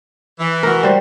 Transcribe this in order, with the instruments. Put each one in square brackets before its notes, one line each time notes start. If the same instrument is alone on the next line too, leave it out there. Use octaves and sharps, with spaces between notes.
[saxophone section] E3
[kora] F#4 A#4
G3 C5